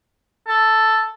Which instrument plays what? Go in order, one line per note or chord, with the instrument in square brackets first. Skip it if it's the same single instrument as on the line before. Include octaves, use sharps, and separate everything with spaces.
[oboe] A4